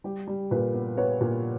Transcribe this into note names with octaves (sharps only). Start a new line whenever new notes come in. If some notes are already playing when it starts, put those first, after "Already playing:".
G3 G4
G3
A#2 B4
B3
B3 C#5
A#2